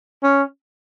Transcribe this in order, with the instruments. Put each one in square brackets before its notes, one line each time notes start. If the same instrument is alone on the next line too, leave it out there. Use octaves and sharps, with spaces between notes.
[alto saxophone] C#4